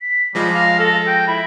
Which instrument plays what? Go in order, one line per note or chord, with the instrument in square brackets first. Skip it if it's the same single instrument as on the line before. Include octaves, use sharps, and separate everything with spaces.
[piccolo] B6
[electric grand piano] F3 G#3 F4 [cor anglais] G3 [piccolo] A#6
[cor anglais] F5
A4
G5
[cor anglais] E4 [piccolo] B5